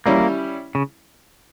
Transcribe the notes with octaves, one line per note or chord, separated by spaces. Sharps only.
G3 A#3 C#4 E4
C#3